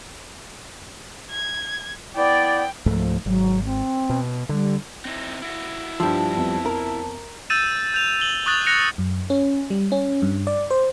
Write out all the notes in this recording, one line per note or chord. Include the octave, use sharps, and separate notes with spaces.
G#6
B3 E4 D5 G5
C#2 G#2 F3 A3
G#1 F#3
C4
B2
D3 G3
C4 D#4 E4
E4 F#4
G2 F3 G3 F4 A5 E6
F2 B3
A#4
E6 G6 A6 D#7 E7
G6 F7
F#7 G7
C#6 D#6 F#6 A6 F7 F#7
F#6 A#6 C#7 F7
F#2
C#4
G3
C#4
G2
D5
C5